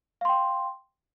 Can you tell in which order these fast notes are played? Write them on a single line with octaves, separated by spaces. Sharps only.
F5 C6 G5